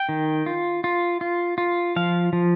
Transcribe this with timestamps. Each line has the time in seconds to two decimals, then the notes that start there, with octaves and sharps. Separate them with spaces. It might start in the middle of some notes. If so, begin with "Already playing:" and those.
Already playing: G5
0.09 D#3
0.46 F4
0.84 F4
1.21 F4
1.58 F4
1.96 F3 F5
2.33 F3